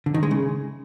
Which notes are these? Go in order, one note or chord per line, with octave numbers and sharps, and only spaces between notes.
D3
D#3
G#3
C#3